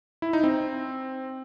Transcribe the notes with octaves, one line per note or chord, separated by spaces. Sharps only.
E4
D#4
C4